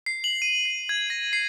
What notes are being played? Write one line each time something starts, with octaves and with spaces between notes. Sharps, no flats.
C7
F#7
D#7
C7
G#6
A#6
C7